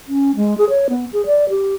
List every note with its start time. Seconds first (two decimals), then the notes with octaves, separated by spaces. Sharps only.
0.08 C#4
0.36 G#3
0.58 G#4
0.70 C#5
0.90 B3
1.13 G#4
1.26 D5
1.49 G4